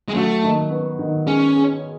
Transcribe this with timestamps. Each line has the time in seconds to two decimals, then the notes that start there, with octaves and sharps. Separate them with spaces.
0.08 G#3
0.14 F#3 A3
0.44 D#3
0.70 B3
0.99 D#3
1.27 G#3 C#4
1.55 G#4